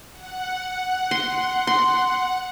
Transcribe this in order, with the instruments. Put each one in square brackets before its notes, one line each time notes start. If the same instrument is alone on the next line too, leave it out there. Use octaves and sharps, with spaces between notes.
[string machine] F#5
[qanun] C6
C6